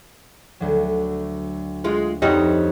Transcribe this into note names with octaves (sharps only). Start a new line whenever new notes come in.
D2 F#3
G#3 F4
F2 F#3 G3 C4 D#4